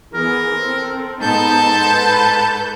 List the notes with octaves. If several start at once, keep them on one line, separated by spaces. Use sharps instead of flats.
E3 B3 G#4 A#4
C4 A4
G#2 B3 D#4 A4 A5 G6
B4